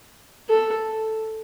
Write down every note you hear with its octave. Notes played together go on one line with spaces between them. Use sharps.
A4